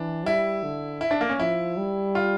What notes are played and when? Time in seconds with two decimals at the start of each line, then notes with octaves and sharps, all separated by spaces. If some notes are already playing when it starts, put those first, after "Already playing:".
Already playing: E3 D4
0.25 G3 E4
0.64 D3
1.01 E4
1.11 D4
1.21 A#3
1.29 C#4
1.39 F3 E4
1.77 G3
2.15 F4